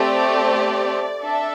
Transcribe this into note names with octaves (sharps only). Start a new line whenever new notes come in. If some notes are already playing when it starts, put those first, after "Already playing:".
Already playing: A3 C4 G4 D5
D4 A4 E5